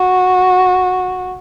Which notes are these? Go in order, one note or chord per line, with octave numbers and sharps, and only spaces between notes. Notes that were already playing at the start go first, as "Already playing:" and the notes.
Already playing: F#4